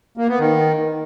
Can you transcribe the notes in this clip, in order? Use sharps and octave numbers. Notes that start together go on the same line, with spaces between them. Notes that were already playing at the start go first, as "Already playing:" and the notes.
A#3
B3
D#3